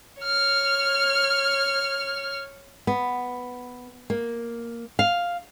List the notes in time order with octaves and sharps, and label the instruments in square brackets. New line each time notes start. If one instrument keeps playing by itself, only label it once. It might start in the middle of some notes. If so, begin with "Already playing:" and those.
[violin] C#5 F6
[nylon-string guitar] B3
A#3
F5